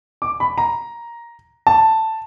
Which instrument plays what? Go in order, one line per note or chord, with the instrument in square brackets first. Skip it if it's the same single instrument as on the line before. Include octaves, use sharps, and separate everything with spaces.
[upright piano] D6
B5
A#5
A5